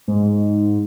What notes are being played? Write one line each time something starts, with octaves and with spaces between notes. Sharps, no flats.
G#2